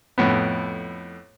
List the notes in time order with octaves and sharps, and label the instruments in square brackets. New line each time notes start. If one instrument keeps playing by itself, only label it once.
[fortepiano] F2 A2 B3